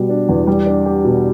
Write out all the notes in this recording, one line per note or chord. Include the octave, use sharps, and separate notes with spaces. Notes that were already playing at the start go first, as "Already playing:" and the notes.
Already playing: B2 G3
D4
E2
G3
D4
G4
B2